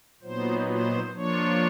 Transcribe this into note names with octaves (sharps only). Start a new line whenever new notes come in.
A#2 F#3 B3 D#4 C5
C5
F3 A#3 D4 F4 C#5